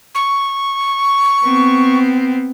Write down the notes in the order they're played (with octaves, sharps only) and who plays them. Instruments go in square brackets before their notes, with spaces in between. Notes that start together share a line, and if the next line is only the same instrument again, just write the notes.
[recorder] C#6
[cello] B3 C4